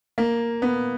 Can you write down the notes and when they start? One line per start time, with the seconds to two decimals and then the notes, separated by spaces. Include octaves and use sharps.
0.18 A#3
0.62 B3